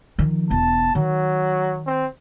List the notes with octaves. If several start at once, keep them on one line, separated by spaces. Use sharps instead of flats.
D#3 F3
E1 B3 A5
D#3 F#3
C4